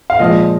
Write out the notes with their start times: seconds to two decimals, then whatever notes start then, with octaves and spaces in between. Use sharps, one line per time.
0.10 F5
0.20 A#2 F3 G#3 D#5